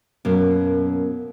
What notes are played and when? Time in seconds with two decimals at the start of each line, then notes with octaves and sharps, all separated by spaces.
0.25 F#2 B2 A#3